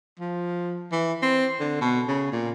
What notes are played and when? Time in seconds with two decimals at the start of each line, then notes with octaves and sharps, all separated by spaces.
0.20 F3
0.92 E3
1.23 C4
1.60 D3
1.81 B2
2.08 C#3
2.32 A#2